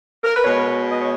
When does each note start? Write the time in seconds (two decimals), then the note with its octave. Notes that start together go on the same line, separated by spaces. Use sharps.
0.24 A#4
0.35 B4
0.45 B2 G#3 C#5
0.90 D#5
1.02 C#5